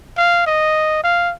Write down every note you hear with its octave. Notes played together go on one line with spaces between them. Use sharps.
F5
D#5
F5